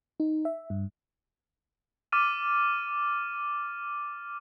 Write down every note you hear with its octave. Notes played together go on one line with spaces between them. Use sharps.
D#4
E5
G2
D6 F6 A6 D#7